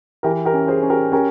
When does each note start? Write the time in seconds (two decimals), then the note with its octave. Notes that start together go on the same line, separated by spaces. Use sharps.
0.23 E3 G4 A#4
0.45 G4 A#4
0.53 C#4
0.68 G#4 C5
0.82 C#4
0.90 G4 A#4
1.12 C#4 G4 A#4